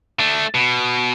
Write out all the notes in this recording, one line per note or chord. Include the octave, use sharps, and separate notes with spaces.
A3 D4
B2